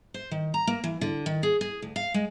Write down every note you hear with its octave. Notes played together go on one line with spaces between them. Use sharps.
C5
D#3
A#5
A#3
E3
D3
D#3
G#4
G#4
D2
F5
G#3